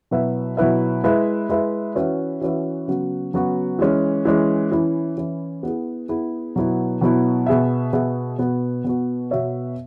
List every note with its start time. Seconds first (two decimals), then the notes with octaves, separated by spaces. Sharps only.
0.11 B2 F#3 E4 B4 E5
0.57 B2 F#3 E4 B4 E5
1.04 G#3 E4 B4 E5
1.49 G#3 E4 B4 E5
1.95 E3 C#4 F#4 B4 E5
2.41 E3 C#4 F#4 B4 E5
2.88 C#3 F#3 B3 F#4
3.34 C#3 F#3 B3 F#4
3.79 E3 G#3 C#4
4.25 E3 G#3 C#4
4.72 E3 C#4 E4
5.18 E3 C#4 E4
5.63 B3 E4 G#4
6.09 B3 E4 G#4
6.56 B2 F#3 B3 E4
7.01 B2 F#3 B3 E4
7.46 B2 B3 G#4 E5
7.93 B2 B3 G#4 E5
8.38 B2 B3 F#4
8.84 B2 B3 F#4
9.31 B2 B3 F#4 C#5 E5